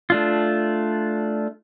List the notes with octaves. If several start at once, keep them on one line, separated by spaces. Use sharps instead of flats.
A3 D4 F4